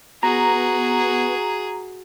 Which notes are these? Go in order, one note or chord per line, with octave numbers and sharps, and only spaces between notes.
B3 F#4 G#4 A#5